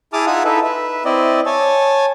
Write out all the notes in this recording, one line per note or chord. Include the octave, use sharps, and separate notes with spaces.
E4 G#4 A5 D6 D#6 F6
D#4 F4 E5 F#5 G#5 D#6
D#4 E4 A4 B4 E5
B4 E5
C4 E4 D5 D#5
C#5 G#5 A5